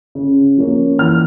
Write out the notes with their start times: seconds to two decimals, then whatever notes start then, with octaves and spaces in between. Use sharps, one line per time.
0.15 C#3
0.57 F3 A#3 C#4
0.99 E3 F6